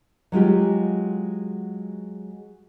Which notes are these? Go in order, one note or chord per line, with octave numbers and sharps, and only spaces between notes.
F#3 G#3 F4 G4